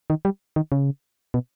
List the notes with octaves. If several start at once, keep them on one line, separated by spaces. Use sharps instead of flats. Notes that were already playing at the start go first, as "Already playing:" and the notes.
D#3
G3
D#3
C#3
B2